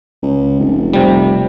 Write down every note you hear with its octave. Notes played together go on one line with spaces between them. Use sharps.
C#2
F1
C3 G3